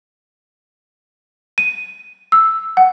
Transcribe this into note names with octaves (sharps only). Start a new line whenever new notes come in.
D#7
E6
F#5